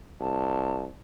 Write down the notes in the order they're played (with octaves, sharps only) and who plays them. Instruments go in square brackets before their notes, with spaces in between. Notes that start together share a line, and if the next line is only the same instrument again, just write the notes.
[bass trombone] C2 [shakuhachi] A5